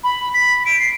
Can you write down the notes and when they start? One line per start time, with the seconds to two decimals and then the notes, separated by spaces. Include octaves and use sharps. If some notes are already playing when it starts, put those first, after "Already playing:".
0.04 B5
0.34 B6
0.66 D7
0.79 C7